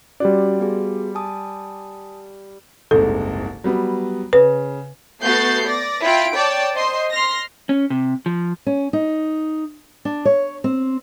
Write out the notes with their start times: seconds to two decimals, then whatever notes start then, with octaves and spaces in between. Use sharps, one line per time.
0.20 G3 C#4 F#4 G4 D5
0.60 B3 F#4 G#4
1.15 G#5 A5 D#6
2.91 F#1 C2 G#2 A4
3.64 F#3 G3 B3
4.33 C#3 B4
5.22 A3 B3 F#4 G6 A6 C7
5.67 D5 A#6
6.03 E4 F4 G5 D7
6.36 C#5 D5 G5 A5
6.74 C5 D#5 C6
7.11 C6 F6 A#6
7.69 C#4
7.90 C3
8.26 F3
8.66 C#4
8.93 D#4
10.05 D4
10.25 C#5
10.64 C4